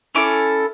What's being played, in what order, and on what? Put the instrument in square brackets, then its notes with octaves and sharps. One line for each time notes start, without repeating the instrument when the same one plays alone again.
[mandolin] C#4 E4 A4 D6